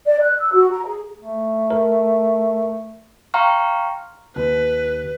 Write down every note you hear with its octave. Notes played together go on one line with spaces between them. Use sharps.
D5
F#6
E6
F#4
A#5
G#4
A3
A#4
F5 G5 A#5 C6 C#6 F6
D#2 B4